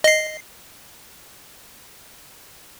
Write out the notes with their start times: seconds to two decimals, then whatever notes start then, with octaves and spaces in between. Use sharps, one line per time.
0.04 D#5 C7